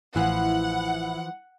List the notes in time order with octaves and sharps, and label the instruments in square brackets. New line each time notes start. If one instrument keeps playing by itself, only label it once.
[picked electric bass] A1 [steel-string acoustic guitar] E3 F3 [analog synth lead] E4 [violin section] F#5